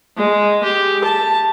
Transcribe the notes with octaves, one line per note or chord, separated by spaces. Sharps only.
G#3
G4
A5